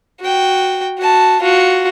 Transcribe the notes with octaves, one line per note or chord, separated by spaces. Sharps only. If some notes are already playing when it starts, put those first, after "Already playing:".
F#4 G5
F#4 A5
F4 F#4